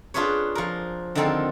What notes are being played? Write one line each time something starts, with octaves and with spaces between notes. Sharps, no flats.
D4 F4 G#4 B4 C#5
F3 A#4
D3 D#3 F3 C4 A4 A#4